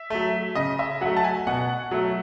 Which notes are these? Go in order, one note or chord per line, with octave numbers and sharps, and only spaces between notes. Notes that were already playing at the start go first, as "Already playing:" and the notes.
Already playing: E5
F#3 A3
C#3 D#5
E5
F#3 A3 F#5
A5
G#5
B2 F#5
F#3 A3